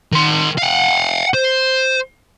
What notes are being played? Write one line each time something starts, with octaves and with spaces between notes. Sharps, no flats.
D#3 C6
F5 F#5
C5